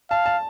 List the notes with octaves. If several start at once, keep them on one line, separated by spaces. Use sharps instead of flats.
F5 A5
A5